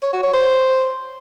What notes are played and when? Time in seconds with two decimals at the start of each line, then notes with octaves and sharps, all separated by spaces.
0.02 C#5
0.13 F#4
0.23 C#5
0.33 C5